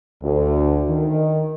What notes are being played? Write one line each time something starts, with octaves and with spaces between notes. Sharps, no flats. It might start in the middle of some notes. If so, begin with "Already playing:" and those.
D2
D#3